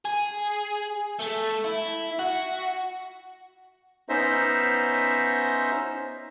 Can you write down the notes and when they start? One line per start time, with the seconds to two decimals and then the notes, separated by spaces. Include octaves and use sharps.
0.05 G#4
1.19 A3
1.65 E4
2.19 F#4
4.09 B3 C#4 D#4 C5 D#5 E5